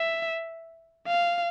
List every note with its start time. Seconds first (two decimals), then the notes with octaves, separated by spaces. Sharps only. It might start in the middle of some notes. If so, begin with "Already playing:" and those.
Already playing: E5
1.07 F5